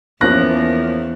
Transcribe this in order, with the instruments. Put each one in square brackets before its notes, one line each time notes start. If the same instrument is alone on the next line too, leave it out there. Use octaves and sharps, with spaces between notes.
[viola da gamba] E2 [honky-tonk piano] F3 A#3 C#4 [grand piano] F#6 A#6